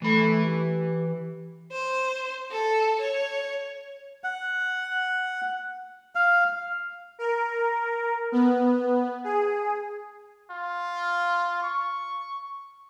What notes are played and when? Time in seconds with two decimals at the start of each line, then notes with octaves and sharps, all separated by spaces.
0.02 E3 A3 B5
0.45 G4
1.72 C5
2.51 A4
3.01 C#5
4.24 F#5
6.15 F5
7.19 A#4
8.32 B3
9.24 G#4
10.51 F4
11.63 C#6